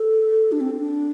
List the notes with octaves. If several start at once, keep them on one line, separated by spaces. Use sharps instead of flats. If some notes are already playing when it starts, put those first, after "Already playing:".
Already playing: A4
D4
C4
D4